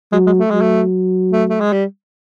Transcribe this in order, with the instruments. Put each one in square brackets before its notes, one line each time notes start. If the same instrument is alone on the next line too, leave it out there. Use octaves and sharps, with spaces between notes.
[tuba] F#3 [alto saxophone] G#3
[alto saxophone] G#3
A3
[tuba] F#3 [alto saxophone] G#3
[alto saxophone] A3
A3
A3
G#3
G3